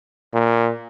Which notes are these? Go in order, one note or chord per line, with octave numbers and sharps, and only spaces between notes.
A#2